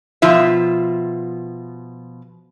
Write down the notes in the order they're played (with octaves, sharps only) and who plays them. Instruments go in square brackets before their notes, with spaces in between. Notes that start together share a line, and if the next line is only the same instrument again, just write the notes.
[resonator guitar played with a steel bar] B2 F3 F4 E5